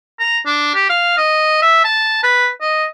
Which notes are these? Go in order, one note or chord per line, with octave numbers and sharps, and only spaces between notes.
A#5
D4
G4
F5
D#5
E5
A5
B4
D#5